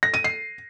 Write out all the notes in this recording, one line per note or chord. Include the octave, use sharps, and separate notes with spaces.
A#6
D#7
C7